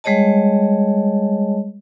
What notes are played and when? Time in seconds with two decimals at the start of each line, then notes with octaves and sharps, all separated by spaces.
0.04 G3 G#3 G#4 C#5 D#5 A5